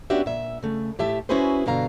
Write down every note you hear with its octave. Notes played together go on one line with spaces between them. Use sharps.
B3 C#4 D4 F#4 G4 E5
A#2 E5
C#3 A3
A2 G4 E5 A5
C#4 E4 F#4 G#4 B4 C5
G2 B2 D3 F5 A#5